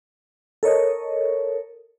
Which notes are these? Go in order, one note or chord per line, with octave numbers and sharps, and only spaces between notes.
A4 A#4 C#5 D#5